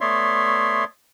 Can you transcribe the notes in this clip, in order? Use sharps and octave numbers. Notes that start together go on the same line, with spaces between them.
A3 B3 C#5 D5 E5 C6